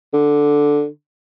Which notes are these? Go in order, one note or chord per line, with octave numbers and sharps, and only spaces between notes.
D3